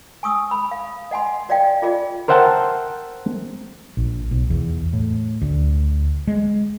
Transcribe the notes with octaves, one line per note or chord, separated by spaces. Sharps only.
G#5 C#6 D#6 E6
B5
F5
D#5 F#5 G#5 C6
F#4 D5 D#5 F5 G5
F4 G#4 D5 D#5
A#4 C5 E5 F#5 G5 A5
A#1
B1
E2
A2
D2
G#3